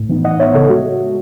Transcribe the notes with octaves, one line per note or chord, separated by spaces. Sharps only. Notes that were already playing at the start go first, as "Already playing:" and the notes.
Already playing: A2
E3 B3 D#4
A2 D#5 F#5
E3 B3 D#4 C#5 E5
C#3 A4 C#5
G#3 F#4